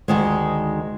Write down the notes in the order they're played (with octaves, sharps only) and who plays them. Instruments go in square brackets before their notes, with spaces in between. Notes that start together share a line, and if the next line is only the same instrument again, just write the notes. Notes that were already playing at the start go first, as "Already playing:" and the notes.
[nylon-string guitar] D2 D#3 G#3